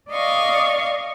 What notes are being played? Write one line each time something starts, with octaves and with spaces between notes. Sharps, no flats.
D5 D#5 F5 C#6